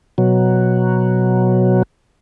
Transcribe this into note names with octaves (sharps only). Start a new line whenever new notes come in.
B2 F#3